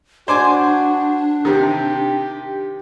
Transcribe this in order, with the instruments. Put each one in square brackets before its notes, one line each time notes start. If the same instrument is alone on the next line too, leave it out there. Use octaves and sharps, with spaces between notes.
[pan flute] D4 [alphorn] F#4 [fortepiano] C5 D5 G#5
[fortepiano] C3 D#3 [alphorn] G4